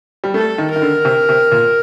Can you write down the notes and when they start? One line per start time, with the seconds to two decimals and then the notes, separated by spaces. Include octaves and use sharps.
0.24 G3
0.34 A3 A4
0.58 D#3
0.70 A#4
0.76 D#3
0.82 D3
1.05 C3
1.29 C3
1.52 A#2